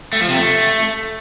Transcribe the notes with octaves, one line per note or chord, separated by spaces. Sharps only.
A3
F3
C3
A3